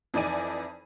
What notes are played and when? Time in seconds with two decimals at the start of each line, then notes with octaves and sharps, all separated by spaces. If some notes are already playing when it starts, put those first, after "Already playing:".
0.14 F2 E3 D#4 D5 G#5 D#7